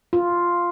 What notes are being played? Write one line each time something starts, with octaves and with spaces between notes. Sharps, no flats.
F4